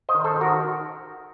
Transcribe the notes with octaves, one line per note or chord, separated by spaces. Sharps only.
C5 D#5
D#3
A4 C5
D#3
F#4 A#4